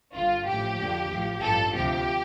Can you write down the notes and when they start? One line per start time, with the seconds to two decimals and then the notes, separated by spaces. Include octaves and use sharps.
0.15 G1 G2 D3 F4
0.47 A1 A2 F3 G4
0.79 F2 D3 F3
1.10 A1 A2 F3
1.42 A1 G2 F3 A4
1.74 D2 C3 F3 G4